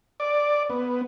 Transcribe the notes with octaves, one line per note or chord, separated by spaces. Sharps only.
D5
B3